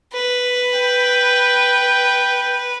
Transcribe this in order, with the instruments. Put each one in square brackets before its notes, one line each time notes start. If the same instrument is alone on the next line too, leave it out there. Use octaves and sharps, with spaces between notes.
[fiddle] B4
[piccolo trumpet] G5